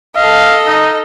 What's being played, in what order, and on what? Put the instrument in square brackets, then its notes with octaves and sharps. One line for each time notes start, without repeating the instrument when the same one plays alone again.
[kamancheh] A4 D#5 [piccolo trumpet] F5
[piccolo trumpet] D#4